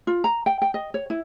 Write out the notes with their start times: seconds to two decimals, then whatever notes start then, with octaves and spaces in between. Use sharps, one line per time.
0.07 F4
0.24 A#5
0.46 G5
0.62 G5
0.74 D#5
0.94 C#5
1.10 E4